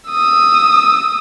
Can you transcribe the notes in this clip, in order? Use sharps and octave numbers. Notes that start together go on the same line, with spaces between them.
D#6 E6